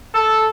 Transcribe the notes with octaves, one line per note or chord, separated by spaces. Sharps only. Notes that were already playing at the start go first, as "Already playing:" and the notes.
A4